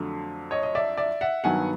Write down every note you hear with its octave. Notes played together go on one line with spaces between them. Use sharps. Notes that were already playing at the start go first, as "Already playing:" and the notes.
Already playing: F2 D3 F#3 A3
C#5 D#5
D#5
D5 E5
D5 E5
E5 F#5
G2 D#3 F#3 B3 F#5 G#5